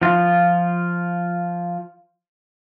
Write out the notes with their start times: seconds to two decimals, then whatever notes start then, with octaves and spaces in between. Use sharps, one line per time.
0.02 F3 F4